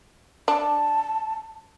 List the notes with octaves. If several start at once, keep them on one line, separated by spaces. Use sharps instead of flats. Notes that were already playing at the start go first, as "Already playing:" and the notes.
D4 A5